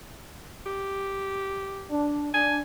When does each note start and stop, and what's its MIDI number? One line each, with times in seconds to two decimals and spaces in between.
0.66 1.90 67
1.91 2.32 62
2.34 2.59 62
2.34 2.59 80